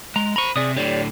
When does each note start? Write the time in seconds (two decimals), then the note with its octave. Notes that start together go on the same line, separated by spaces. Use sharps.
0.16 G#3 A#5
0.36 C5 A#5 B5 C#6
0.56 C3 G#4 D5 D#6
0.76 A2 D3 G4 C#5 D5